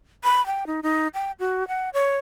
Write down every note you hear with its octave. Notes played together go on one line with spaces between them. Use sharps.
B5
G5
D#4
D#4
G5
F#4
F#5
C#5